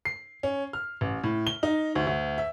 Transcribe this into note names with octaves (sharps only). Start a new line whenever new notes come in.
C7
C#4
F6
A1
A2
G7
D#4
D2
D2
E5